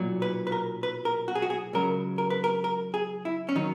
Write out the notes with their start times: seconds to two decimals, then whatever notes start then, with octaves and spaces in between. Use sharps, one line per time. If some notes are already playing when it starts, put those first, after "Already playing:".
Already playing: B1 A#2 F#3
0.22 B4
0.47 B4
0.52 A#4
0.83 B4
1.05 A#4
1.28 F#4
1.35 G#4
1.42 F#4
1.50 G#4
1.73 C#2 C#3 F#3 A#4
2.18 A#4
2.30 B4
2.44 A#4
2.64 A#4
2.94 G#4
3.25 E4
3.49 C#4
3.56 D#3 F#3 D#4